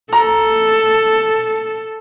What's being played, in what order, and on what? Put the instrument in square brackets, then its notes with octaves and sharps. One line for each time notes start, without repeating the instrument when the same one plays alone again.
[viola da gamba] A4 [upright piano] A#5